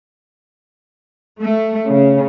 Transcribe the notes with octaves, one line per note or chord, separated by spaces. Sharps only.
A3
C#3